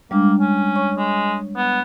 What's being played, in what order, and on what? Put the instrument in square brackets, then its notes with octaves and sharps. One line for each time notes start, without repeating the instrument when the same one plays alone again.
[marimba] G3 G#3 D4 [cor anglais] A#3
[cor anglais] C#4
[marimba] C#5 C#6
[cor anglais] G#3
B3